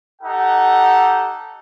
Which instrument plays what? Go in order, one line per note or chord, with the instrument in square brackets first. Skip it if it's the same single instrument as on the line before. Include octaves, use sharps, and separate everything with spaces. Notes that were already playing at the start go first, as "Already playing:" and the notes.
[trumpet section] D#4 G4 A4 F#5